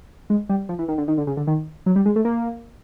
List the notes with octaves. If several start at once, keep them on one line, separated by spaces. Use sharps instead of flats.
G#3
G3
F3
E3
D#3
D3
D#3
D3
C#3
D3
D#3
F#3
G3
G#3
A3
A#3